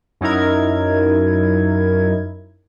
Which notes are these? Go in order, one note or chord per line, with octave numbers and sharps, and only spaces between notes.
F#2 F#3 D#4 E4 A#4 G#6